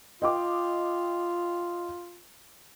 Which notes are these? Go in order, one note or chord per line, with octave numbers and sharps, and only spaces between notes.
F4 D#5 G5 D6